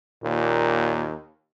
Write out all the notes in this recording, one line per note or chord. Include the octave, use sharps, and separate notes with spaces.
D#2 A#2